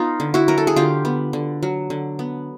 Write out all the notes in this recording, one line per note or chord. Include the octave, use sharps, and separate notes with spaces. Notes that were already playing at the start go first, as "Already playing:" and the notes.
Already playing: B3 D#4 F4
D3
E4 F#4
F#3 A#4
A4
G#4
D3 F4 G4
B3
D3
F#3
D3
B3